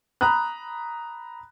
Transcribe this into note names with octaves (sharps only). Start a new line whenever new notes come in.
A#5 B5 D#6 F#6